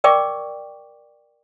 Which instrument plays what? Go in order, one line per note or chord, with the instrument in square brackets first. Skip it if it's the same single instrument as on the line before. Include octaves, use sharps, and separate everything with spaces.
[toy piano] A#4 D5 G5 C#6 D6